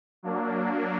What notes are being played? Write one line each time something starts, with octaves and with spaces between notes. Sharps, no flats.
F#3 A#3 D4